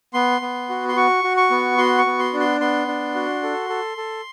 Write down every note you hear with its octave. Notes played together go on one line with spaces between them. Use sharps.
B3 C6
B3
F#4
C6
F#4 C#6
F#4
C#6
B3
F#4 C6
C#6
B3
C6
D4
C6
B3 C6
D4
F#4
A4
A4
A4